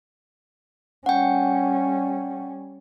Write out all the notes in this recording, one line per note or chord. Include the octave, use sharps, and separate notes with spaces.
G3 C#4 F#5 G5